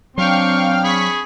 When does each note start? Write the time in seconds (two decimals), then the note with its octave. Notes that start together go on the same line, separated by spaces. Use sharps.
0.18 F#3 C4 D4 F5 G5 C#6 F6
0.83 G#4 B5 C#6 B6